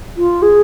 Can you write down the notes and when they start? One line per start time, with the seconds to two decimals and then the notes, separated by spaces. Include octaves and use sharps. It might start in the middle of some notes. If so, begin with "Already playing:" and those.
0.17 F4
0.42 G#4